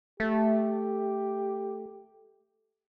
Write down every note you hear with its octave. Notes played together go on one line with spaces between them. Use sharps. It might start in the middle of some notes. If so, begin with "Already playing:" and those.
A3 G4